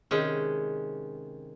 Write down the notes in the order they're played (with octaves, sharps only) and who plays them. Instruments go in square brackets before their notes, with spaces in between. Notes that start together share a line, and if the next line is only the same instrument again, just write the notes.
[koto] C3 D#3 G#3 C#4